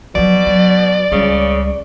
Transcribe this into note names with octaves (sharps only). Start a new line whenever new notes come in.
B2 F3 F#3 D5
F#3
C#2 C#3 G3